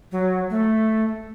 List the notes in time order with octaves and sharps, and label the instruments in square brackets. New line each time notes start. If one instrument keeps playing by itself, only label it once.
[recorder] F#3
A3